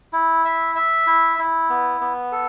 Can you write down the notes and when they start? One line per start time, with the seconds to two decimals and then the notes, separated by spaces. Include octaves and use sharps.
0.13 E4
0.45 E5
0.75 E5
1.07 E4
1.39 E4
1.69 B3
2.01 B3
2.32 A4